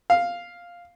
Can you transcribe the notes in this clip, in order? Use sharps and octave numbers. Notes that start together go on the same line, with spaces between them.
F5